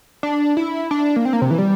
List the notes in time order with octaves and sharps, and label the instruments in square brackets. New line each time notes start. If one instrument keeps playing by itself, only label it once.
[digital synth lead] D4
E4
D4
A#3
C4
A#3
C3
E3
G3